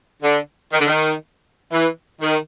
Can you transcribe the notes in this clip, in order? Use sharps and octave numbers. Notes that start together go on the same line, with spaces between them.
D3
D#3
D3
D#3
E3
D#3